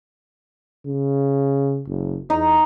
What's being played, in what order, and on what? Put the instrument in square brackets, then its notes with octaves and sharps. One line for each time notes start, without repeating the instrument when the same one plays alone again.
[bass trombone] C#3
F#1
[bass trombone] E2 [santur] D#4